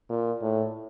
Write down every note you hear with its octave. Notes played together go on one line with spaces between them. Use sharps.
A#2
A2